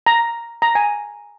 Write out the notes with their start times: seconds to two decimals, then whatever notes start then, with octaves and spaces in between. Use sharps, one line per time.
0.06 A#5
0.62 A#5
0.75 G#5